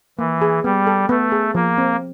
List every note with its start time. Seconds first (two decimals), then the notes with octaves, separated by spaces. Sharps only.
0.19 E3 A#3
0.42 G#4
0.64 G3 B3
0.87 A4
1.09 A3 B3
1.32 G#4
1.55 F3 A#3
1.78 C4